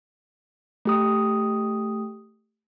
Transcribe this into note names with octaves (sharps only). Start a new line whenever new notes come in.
A3 G4 D#6